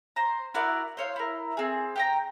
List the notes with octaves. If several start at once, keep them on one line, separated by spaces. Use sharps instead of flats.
C5 A#5
E4 F#4 A#4 D5
C5 C#5 F5
E4 A#4
C4 G#4
G4 G5 A#5